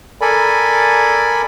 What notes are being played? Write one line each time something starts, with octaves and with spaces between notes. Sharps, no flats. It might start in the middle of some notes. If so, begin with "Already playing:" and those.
A4 A#4 D5 G#5 B5